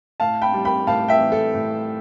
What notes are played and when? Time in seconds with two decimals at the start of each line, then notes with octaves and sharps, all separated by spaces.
0.20 A2 F5 A5
0.42 G5 B5
0.54 G3
0.65 G5 B5
0.87 A2 F5 A5
1.08 E5 G5
1.20 E3
1.32 A4
1.54 A2